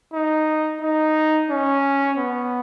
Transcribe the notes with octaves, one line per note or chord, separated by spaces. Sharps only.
D#4
D#4
C#4
B3